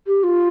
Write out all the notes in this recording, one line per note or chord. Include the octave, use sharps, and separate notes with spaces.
G4
F4